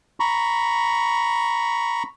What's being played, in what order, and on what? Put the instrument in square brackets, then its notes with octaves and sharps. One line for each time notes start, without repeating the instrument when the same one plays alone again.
[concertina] A#5 B5 C#6